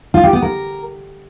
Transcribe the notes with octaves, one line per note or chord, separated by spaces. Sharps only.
F4
G4
B3
A#4